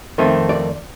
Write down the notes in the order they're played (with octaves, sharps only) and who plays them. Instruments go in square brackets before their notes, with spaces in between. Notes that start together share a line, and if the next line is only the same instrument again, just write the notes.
[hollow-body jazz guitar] F2 D#3 A3 C4
D5